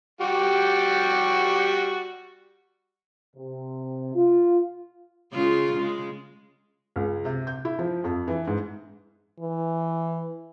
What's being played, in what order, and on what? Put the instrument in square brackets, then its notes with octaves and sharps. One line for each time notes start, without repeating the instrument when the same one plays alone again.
[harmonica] G3 F#4 G4
[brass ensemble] C3
F4
[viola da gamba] C#3 G#3 F4
C#3 G#3
[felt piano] C#2
C3
G6
E4
F3
F2
E3
G#2
[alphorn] E3